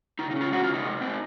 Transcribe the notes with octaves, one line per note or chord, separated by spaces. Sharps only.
C#3 D#4
D#4
C#4
F4
G#3 F#4
F4
C#3 D#4
C3
C4